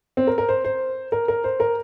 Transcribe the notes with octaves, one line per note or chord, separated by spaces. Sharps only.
C4
A#4
A#4
C5
C5
A#4
A#4
C5
A#4